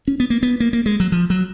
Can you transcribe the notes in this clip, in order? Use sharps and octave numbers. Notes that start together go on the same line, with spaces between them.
C#4
B3
A#3
B3
A#3
A#3
G#3
F#3
F3
F#3